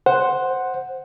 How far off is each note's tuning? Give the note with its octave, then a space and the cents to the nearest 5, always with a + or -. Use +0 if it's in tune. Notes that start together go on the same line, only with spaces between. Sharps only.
C5 +0 F#5 +0